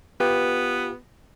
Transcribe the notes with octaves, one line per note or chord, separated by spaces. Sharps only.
B3 F4 G4 B4